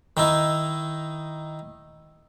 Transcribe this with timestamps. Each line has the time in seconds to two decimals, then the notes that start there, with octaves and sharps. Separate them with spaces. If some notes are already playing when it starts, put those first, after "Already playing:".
0.17 D#3 D#4 E4